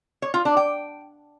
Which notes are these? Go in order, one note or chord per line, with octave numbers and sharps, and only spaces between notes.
C#5
F4
D4
G5